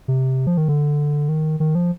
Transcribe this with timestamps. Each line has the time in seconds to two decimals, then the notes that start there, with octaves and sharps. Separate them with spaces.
0.08 C3
0.47 F3
0.57 D#3
0.68 D3
1.29 D#3
1.60 D#3
1.75 F3